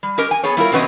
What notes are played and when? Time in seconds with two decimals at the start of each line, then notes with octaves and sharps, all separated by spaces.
0.03 G3
0.18 C#4 G4 A#4 D#5
0.31 G#5
0.43 B3 G#4 A4 C#5
0.57 G3 E4 F4 A#4
0.72 E2 C3 F#3 B3 C#4 D#5